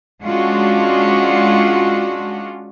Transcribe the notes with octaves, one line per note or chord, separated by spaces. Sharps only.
G#3 C#4 D4 F4 F#4